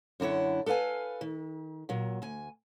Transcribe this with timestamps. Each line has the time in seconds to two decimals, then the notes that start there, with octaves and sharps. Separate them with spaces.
0.20 F#2 D3 E4 C#5 F#5
0.66 A4 B4 C#5 F5 G#5
1.21 D#3
1.89 A#2 F#3
2.22 D2 G#5